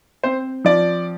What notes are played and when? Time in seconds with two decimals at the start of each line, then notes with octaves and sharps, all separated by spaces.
0.23 C4 C5
0.65 F3 D5